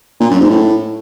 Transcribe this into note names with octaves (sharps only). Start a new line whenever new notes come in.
A#2
F#2
G#2
A2